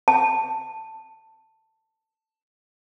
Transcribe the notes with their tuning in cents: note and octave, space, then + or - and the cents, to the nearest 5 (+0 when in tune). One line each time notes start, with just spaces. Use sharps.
A5 +10